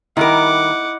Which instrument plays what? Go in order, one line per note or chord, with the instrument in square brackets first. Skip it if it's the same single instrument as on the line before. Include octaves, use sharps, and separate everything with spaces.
[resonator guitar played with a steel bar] D#3 G3 A#4 [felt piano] D#4 E4 [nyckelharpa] F#5 D6